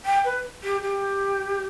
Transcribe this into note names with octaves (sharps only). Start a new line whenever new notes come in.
G5
B4
G4
G4